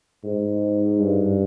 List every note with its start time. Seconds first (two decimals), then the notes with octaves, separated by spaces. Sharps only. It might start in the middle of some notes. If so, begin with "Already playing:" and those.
0.24 G#2
1.00 G2